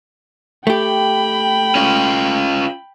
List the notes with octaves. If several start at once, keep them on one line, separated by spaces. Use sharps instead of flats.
A3 G4 G5 B5
C#4 F4